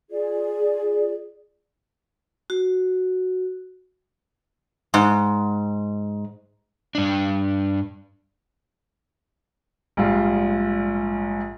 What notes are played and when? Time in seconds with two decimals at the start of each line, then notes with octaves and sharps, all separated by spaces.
0.10 F4 G#4 D5
2.50 F#4
4.94 G#2
6.95 G2 D4
9.97 A#1 G#2 G3 F4